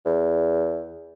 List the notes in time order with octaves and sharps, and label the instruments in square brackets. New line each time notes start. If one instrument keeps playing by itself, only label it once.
[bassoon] E2